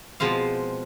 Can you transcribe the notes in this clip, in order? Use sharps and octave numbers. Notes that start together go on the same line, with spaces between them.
B2 F3 G#3 C4 F5